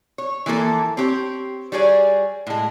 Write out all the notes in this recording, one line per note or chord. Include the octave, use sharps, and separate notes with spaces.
C#5
E3 F3 A#3 A4
C4 G4 C#5
G3 F#4 G#4 C#5 D5 G#5
A2 G#3